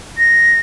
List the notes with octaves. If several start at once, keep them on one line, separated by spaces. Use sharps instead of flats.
A#6